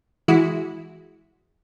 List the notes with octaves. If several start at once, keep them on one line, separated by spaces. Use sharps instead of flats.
E3 G#3 E4 F#4